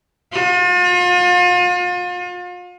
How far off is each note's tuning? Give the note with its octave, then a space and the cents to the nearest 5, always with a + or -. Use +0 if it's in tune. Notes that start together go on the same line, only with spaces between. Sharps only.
F4 +40